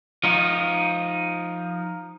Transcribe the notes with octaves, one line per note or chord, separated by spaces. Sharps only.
F3 D#4